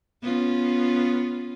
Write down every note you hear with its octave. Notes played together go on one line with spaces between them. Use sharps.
B3 C#4 F4